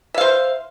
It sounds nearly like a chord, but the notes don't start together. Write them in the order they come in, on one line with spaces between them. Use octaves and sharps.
E5 F5 C5